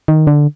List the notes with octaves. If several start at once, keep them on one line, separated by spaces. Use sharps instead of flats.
D#3
D3